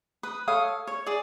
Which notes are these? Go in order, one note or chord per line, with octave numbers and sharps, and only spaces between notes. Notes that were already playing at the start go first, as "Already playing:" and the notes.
B4 D#6
A4 C#5 F5 D#6
C#5
G#4 D5